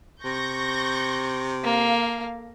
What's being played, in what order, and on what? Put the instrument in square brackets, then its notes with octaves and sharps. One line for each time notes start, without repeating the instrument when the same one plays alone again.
[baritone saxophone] C3 [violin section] C#6 G6 A#6
[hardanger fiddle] A#3 [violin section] A4 F5